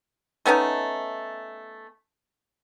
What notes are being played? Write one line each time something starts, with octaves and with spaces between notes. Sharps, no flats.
A3 B3 C#4 D#4